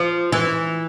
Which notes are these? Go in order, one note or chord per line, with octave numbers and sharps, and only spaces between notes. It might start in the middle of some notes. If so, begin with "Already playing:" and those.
Already playing: F3
E3